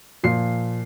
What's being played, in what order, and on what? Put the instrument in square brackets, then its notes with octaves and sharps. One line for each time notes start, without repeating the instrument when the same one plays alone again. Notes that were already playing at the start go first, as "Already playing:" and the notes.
[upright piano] A#2 F3 C7